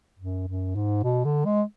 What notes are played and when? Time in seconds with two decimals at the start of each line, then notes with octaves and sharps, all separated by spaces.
0.19 F#2
0.48 F#2
0.75 G#2
1.03 B2
1.25 D3
1.45 G#3